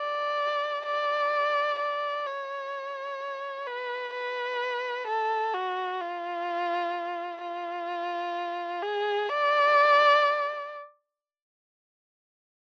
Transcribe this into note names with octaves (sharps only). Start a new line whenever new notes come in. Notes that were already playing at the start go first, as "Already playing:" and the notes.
Already playing: D5
D5
D5
C#5
B4
B4
A4
F#4
F4
F4
G#4
D5